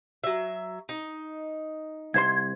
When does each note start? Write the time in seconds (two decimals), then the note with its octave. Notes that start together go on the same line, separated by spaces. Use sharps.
0.24 F#3 E5
0.89 D#4
2.14 C2 C5 C6 G#6